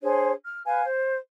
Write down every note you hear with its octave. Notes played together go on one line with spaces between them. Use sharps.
D4 G#4 C5 C#5
F6
B4 F5 G#5
C5